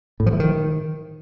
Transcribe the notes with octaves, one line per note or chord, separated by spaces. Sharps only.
A2
F3
E3
D#3